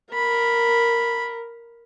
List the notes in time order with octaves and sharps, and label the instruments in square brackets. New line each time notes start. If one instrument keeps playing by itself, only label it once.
[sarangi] A#4 [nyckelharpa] B5